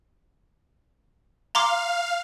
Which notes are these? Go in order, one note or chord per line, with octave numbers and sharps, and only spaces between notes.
F5 A#5 C6 D6